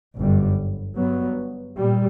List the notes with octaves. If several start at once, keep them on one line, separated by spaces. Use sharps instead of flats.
G1 F#2 D3 G3
G2 F#3 B3
A#2 G3